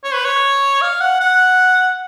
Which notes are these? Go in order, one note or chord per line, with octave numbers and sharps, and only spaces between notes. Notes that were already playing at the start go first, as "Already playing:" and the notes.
C#5
B4
C#5
F5
F#5
F#5